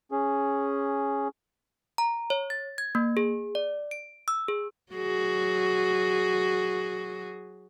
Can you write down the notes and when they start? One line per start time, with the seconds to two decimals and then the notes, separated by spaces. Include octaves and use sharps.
0.12 C#4 G#4
1.98 A#5
2.30 C#5
2.50 A6
2.78 G#6
2.95 A#3
3.17 G#4
3.55 D5
3.91 D7
4.28 E6
4.48 G#4
4.93 F#3 F#4 G#4